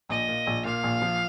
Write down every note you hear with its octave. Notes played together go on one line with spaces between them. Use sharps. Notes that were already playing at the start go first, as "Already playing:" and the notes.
A#1 D#5
A#2
A#1
A#2 F5
A#1
F3